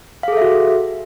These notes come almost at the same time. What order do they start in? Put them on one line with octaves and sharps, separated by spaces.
F5 G#4 A4 E5 F#4